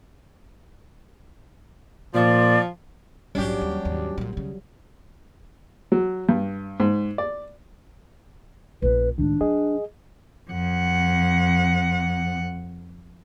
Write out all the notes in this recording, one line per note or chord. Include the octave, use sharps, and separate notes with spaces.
A#2 F3 D5
A#1 G#2 F#3 G3 C#4 D4 G4
D#2
D#2 G#2
A#1 A#2
D#2 C#3
F#3
G2
G#2
D5
A#1 C#4 B4
C#2 A2 D#3 D4
F#3 G#4 D#5
F2 F#5